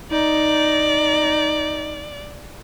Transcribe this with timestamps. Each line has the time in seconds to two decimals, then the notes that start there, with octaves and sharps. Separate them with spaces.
0.12 D#4 D5